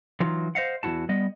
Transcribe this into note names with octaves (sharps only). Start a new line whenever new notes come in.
E3 F#3 D#4 F4
C5 D#5 F5 F#5
E2 D#3 E4 F#4 A5
G3 B3 D#5